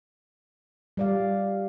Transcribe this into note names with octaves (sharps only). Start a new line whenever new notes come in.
G3 D5 F5